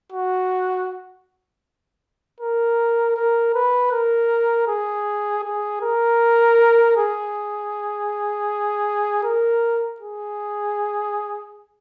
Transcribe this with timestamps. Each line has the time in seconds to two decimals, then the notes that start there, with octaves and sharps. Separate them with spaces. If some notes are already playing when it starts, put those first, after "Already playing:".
0.12 F#4
2.41 A#4
3.17 A#4
3.55 B4
3.92 A#4
4.68 G#4
5.44 G#4
5.82 A#4
6.97 G#4
9.24 A#4
10.00 G#4